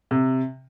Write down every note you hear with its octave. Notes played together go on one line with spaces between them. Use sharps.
C3